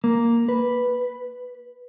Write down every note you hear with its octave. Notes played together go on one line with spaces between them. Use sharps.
A#3
B4